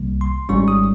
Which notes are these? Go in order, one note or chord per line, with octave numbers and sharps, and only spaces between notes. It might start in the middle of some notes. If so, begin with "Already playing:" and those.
Already playing: C2 C3 D#3 G3 A#3
C6
G#1 G#2 G3 C#4 C#6
D#6